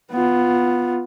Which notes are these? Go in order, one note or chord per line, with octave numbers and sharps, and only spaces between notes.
B3 F4